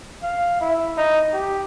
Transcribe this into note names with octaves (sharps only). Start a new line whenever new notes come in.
F5
E4
D#4
G4